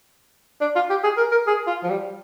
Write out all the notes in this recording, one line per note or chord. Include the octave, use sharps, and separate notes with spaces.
D4
F4
G4
G#4
A#4
A#4
G#4
F4
F3
G3